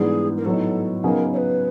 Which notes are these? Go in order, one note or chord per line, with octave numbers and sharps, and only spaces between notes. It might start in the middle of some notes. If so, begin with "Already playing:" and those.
Already playing: G#2 E3 G3 B3 D4 G#4
A#4
A2 F#3 B3 D#4 A4
C#3 F#3 B3 D#4 G#4 A#4
C#5
B4